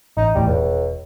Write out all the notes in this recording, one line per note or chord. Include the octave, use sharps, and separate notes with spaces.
A1 D#4
D#1 E2 A2 G3
E1 C#2